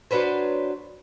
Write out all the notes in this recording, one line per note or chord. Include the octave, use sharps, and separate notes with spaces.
F#3 D4 B4 C5